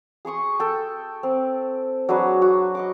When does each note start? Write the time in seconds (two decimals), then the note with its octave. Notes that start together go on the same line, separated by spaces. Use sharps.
0.25 G#4 C6 C#6 D#6
0.60 A4 G5
1.23 C4
2.09 F#3 D4 G#4 B4
2.42 F#4
2.75 D#5 C#6 D6